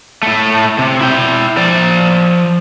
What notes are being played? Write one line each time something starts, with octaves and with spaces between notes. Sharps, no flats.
A2 A3
C3
E4 G5
F3 D5